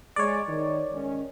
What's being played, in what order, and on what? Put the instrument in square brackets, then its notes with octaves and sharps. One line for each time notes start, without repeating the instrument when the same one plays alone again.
[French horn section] G#3 [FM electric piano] C#5 D5
[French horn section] D#3
D#3 G#3 C#4